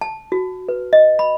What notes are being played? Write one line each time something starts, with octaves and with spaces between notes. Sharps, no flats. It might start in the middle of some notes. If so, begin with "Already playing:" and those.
A5
F#4
B4
D#5
B5